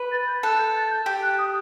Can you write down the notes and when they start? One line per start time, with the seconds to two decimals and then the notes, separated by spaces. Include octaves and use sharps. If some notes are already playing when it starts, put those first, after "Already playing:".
Already playing: B4
0.12 A6
0.27 G6
0.43 A4 F#6
0.59 G6
0.75 A6
0.91 G6
1.06 G4 G6
1.22 F#6
1.38 D#6